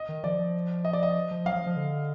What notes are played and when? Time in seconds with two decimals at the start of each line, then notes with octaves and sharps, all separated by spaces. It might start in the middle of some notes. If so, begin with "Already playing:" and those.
Already playing: D#5
0.09 D#3
0.24 F3 D5
0.39 F3
0.85 D#5
0.93 D5
1.03 D#5
1.31 F3
1.45 F#3 F5
1.56 F3
1.66 F3
1.76 D3